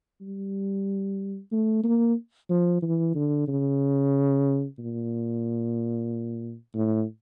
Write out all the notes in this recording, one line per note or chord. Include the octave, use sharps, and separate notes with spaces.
G3
A3
A#3
F3
E3
D3
C#3
A#2
A2